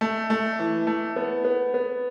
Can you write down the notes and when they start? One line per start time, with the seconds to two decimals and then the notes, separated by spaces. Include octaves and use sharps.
0.01 A3
0.30 A3
0.59 E3
0.87 A3
1.16 B3
1.45 B3
1.74 B3